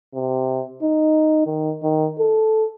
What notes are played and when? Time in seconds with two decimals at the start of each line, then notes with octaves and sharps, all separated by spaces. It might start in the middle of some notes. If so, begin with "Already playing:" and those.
0.14 C3
0.82 D#4
1.46 D#3
1.83 D#3
2.19 A4